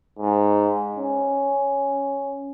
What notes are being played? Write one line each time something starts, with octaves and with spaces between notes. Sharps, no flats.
G#2
C#4